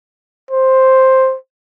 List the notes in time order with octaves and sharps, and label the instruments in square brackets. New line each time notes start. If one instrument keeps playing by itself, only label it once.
[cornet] C5